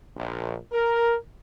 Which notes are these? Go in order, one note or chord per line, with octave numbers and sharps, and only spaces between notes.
A#1
A#4